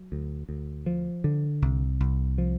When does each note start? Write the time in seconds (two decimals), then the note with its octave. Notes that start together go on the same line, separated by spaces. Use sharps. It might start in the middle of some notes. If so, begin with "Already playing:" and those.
Already playing: F#3
0.12 D2
0.49 D2
0.86 F3
1.24 D3
1.62 C2
2.00 C2
2.38 F3